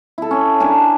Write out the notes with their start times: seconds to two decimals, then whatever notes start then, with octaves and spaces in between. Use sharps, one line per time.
0.18 E4 A4
0.31 C#4
0.60 D4 A#4 G#5 D6